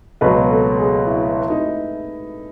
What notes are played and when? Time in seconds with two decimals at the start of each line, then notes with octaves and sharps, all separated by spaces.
0.21 C#2 B2 F#3 B4
0.50 A4
0.78 G#4
1.07 E4
1.50 D#4